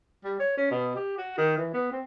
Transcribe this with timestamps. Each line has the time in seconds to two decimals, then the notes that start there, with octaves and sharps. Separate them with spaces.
0.24 G3
0.39 C#5
0.57 C#4
0.71 B2
0.96 G4
1.17 F#4
1.38 D#3
1.57 E3
1.74 B3
1.91 C4